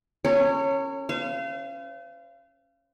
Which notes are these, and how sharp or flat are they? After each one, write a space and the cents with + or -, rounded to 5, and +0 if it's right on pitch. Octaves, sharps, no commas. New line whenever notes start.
C#4 -10 A#4 -45 C#5 +0
C5 -45 F5 -30